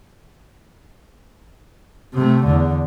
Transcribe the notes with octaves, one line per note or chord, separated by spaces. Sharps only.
C3 A3
E2 D3